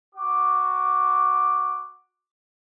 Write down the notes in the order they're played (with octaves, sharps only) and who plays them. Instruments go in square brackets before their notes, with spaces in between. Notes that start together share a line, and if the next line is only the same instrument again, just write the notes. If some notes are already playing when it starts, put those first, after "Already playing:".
[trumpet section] F#4 D6